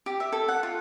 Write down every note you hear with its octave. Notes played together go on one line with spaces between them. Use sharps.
G4
E5
A4
F#5
F4